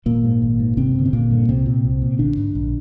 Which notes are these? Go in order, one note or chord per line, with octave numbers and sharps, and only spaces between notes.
G#1 A#2 A#3
G#2
G#1
G#2
G#1 C3 C4
G2 D3
C4
G#1 A#2 A#3
G2 D3
C2 C3 C4
A#2
C2
A#2
A#1 D3 D4
G#2
A#1